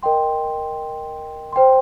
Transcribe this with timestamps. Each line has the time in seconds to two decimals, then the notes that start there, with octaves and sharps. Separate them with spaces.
0.03 A#4 D#5 G5 C6
1.53 C5 G5 C6